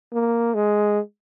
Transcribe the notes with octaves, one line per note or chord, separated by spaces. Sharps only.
A#3
G#3